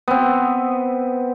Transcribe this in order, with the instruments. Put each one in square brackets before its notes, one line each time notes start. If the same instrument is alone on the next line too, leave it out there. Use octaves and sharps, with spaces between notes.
[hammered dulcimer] B3 C4